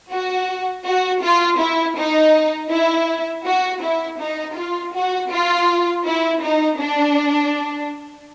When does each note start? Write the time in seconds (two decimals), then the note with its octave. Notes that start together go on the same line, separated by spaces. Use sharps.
0.11 F#4
0.85 F#4
1.22 F4
1.59 E4
1.96 D#4
2.71 E4
3.45 F#4
3.82 E4
4.19 D#4
4.57 F4
4.94 F#4
5.31 F4
6.05 E4
6.42 D#4
6.80 D4